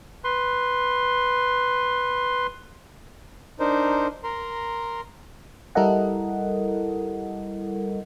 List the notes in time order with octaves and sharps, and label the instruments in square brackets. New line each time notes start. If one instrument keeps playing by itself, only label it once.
[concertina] B4 C6
[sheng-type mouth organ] D4 D#4 A#4 C5
A#4 A#5 C6
[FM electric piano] G3 E4 A4 A#4 D#5 F#5